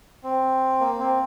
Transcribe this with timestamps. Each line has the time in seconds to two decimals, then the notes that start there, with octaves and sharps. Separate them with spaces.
0.23 C4
0.80 A#3
0.99 C4